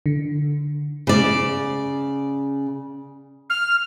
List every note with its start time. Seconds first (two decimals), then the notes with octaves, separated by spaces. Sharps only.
0.06 D3
1.07 C#3 D5
3.50 F6